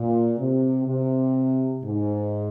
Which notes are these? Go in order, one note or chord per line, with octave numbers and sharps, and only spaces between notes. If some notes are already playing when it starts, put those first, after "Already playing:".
Already playing: A#2
C3
C3
G#2